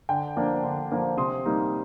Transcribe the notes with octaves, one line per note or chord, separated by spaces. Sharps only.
D3 G5
F3 A#3 D4
D3
F3 A#3 D4
C3 C6 D#6
G3 A#3 D#4